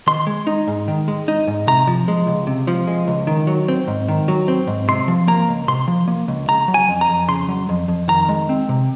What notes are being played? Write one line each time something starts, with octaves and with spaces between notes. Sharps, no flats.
D#3 C6
G#3
D#4
G#2
D#3
G#3
D#4
G#2
C3 A#5
F3
G#3
C#2
C3
F3
G#3
C#2
D#3
F#3
C4
G#2
D#3
F#3
C4
G#2
C3 C6
F3
A#3 A#5
C#2
C3 C6
F3
A#3
C#2
C#3 A#5
F#3
G#5
F2
A#5
F2
C#3 C6
F#3
F2
F2
D#3 A#5
G#3
C4
C3